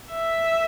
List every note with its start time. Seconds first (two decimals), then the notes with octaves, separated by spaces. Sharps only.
0.11 E5